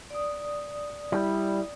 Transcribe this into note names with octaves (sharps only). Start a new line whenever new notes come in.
D5 D#6
G3 E4